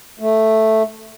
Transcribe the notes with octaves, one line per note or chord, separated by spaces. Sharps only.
A3